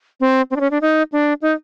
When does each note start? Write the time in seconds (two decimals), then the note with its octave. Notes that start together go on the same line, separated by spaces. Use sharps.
0.20 C4
0.51 C4
0.56 D4
0.60 C#4
0.71 D4
0.81 D#4
1.12 D4
1.42 D#4